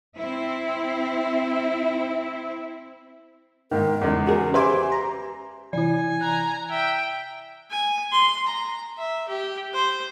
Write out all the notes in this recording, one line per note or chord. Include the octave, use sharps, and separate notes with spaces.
C4 E4
G#2 D#3 A#4
E2 C#3 G#3
C#4 F#4 G#4 A#4
G4 B4 C5 E5 G#5 C6 D6
A#5
C3 E3 E4 D5 G#5
A#5 F#6
E5 G5
G#5
C6
A#5
E5
G4
C5